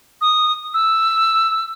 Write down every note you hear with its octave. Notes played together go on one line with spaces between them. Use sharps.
D#6
E6